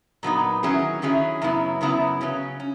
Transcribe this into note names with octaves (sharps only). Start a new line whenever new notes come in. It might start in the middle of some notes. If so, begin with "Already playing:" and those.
A#2 F#3 B3 D#4
D#3 F#3 C#4 E4 G#4
D#3 F#3 C#4 E4 G#4
F#2 C#3 F#3 B3 E4
F#2 C#3 F#3 B3 E4
C#3 F#3 C#4
C#4